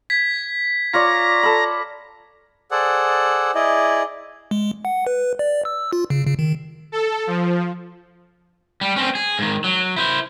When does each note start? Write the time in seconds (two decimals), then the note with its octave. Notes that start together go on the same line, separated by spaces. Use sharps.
0.10 G#6 B6
0.94 F4 C#5 D5 A#5
1.43 A4 B5
2.71 G#4 A4 C5 D5 F#5
3.55 E4 G#4 D5 D#5
4.51 G#3
4.85 F#5
5.07 B4
5.39 D5
5.65 E6
5.93 F4
6.10 C#3
6.26 C#3
6.39 D#3
6.92 A4
7.27 F3
8.81 G3
8.96 C4 C#4
9.15 G#4
9.39 G#2 D#3
9.64 F#3
9.96 E4 C5